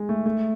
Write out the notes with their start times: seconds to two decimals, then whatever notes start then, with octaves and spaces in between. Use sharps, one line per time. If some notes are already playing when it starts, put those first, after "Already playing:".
Already playing: G#3
0.09 A3
0.26 A3